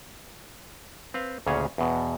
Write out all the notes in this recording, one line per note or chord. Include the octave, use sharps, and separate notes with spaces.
C4 B4 F5
D2 A#2 C#3 C#4 G#4 C#5
E2 B2